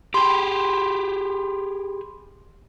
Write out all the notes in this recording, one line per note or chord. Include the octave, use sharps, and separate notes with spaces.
G4 G#4 G5 B5 C6